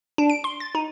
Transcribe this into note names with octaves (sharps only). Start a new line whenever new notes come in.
D4
D7
C6
A6
D#4